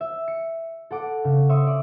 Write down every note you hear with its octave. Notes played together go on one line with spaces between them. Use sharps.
E5
C#7
A4 F#5 D6
C#3
C#5 E5 C6 C#6 D#6
D5